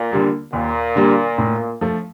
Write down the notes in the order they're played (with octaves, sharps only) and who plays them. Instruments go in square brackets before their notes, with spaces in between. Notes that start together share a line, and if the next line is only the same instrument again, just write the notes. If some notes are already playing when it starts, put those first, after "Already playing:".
Already playing: [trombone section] A#2
[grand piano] D3 G3 A#3
[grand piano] D#2 [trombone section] A#2
[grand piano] D3 G3 A#3
A2
F3 A3